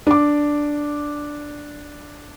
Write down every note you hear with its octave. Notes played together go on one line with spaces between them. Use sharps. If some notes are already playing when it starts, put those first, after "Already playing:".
D4 D6